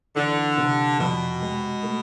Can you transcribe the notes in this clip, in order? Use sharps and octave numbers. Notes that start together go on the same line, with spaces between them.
D3 E3
C3
F2 B2
G#3
A3